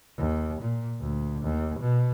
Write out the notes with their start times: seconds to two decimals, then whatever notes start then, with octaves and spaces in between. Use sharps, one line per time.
0.18 D#2
0.62 A#2
1.01 D2
1.43 D#2
1.80 B2